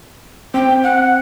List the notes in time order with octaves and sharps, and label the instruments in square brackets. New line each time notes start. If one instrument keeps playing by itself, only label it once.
[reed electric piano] C4 [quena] G5
[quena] F#5